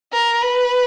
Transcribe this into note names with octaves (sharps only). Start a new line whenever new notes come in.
A#4
B4